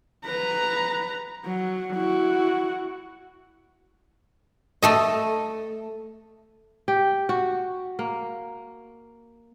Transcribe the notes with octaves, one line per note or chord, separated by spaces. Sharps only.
B4 A#5
F#3
E4 F#4
A3 A4 D#5
G4
F#4
A#3